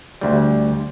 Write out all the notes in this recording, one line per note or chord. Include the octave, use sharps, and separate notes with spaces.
D2 G3